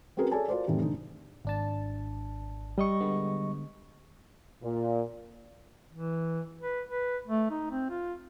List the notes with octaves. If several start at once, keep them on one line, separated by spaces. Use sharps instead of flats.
C4 C#4 F#4 G#4 A#4 B4
G#4 A4 C#5 D5 G#5 A5
F4 F#4 A#4 C5 D5
F2 A2 D#3 E3 G3
F1 D3 D#4
G#1 D4 A5
G3 D#5 C#6
D3 G#3 B3
A#2
E3
B4
B4
A3
D#4
C4
F4